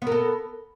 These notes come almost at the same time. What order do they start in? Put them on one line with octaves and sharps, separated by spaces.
B3 A#4 A4